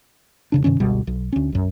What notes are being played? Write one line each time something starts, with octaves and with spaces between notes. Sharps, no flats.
E1 C#3 D4
G2 C3 D#3 C#4
G1 C#2 B2 G3
B1
D2 C#4
B1 F#2